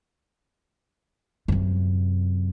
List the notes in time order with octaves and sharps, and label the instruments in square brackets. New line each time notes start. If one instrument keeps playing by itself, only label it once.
[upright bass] F#2 C3